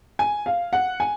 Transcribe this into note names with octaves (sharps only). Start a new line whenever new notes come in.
G#5
F5
F#5
G#5